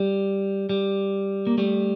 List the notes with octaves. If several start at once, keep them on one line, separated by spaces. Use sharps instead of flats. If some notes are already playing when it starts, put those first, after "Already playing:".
Already playing: G3
G3
A#3
G3 A3